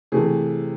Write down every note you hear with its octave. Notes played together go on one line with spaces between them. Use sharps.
C3 E3 A3 G#4